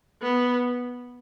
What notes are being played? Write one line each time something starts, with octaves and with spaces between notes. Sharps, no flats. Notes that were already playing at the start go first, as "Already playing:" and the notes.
B3